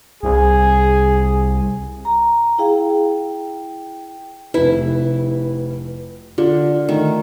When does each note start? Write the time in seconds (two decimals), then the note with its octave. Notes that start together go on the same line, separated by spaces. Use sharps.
0.23 C2 G#4
2.05 A#5
2.58 E4 G#4 F5 G5
4.54 F1 E4 B4
6.38 D3 F4
6.89 D#3 A3